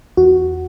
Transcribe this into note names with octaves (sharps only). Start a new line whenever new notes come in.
E2 F#4